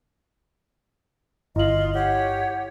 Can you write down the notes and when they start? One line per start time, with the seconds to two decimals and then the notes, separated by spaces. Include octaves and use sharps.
1.56 G1 E4 F4 D#5 F#7
1.94 G4 C#5 F#5